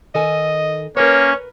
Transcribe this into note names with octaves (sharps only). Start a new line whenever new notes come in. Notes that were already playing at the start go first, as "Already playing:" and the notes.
D#3 A4 D#5 G#5
A#3 C#4 A#4 B4 C#5